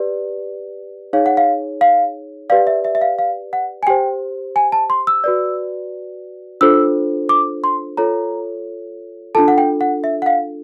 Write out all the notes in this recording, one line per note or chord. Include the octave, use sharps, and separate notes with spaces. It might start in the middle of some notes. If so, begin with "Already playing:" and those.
Already playing: G4 B4 D5
D#4 G#4 C#5 F5
F#5
F5
F5
G4 B4 D5 F5
E5
E5
E5
F5
F5
F#5
G#5
G4 C5 G5
G#5
A5
C6
E6
F#4 B4 D5
D4 F4 A4 C5 E6
D6
C6
F4 A4 C#5 A#5
D4 F4 A4 A5
F#5
G5
F#5
E5
F#5
F5